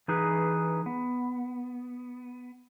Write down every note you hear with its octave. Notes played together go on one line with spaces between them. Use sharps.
E3 D#4 G#4 B4
B3